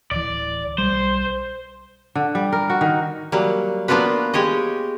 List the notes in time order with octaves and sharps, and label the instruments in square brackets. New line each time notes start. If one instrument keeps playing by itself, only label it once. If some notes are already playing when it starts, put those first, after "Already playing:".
[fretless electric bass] D1 E3 [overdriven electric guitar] D5
[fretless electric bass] B1 G3 [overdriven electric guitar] C5
[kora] D3
G3
A#4
F#4
D#3
[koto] F#3 G3 A#3
A#3 B3 D4 F4 F#4 B4
G#3 G4 C#5 D#5